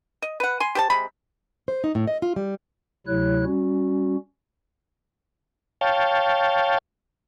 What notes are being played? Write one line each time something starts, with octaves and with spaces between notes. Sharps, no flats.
D#5
B4 F#5
G#5 C6
G4 C5 A5
C3 G#3 C4 B5
C5
D#4
A2
D#5
F4
G3
D2 C3 F#3 E4 C#5 F#6
G3 C#4 F#4
C#5 F5 G5 A5